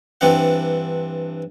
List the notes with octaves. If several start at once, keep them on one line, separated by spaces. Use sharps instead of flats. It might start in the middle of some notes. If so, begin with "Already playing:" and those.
G2 E3 C4 D4 F#5